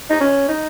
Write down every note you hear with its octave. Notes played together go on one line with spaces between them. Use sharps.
D#4
C#4
D#4